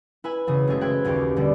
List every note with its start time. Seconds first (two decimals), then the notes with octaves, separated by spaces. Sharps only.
0.24 E4 B4 G#5 B5
0.47 E1 C#3 D#6
0.67 F#1 G#3 A3 G#4 C5
0.81 B4 C5 E5 G5 F#6 G#6
1.04 F#1 D#2 C#4 G4
1.36 D#2 B2 D3 G3